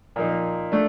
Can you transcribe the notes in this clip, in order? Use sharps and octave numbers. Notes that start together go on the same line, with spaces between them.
A#2 F3 A#3 D#4
A3 D4